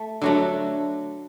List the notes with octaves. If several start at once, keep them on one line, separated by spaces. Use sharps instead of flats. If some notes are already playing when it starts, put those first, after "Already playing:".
Already playing: A3
D3 F#3 A3